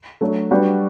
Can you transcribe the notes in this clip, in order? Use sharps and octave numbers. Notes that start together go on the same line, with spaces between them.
F#3 A3 D4 F#4
G3 D4 F#4 B4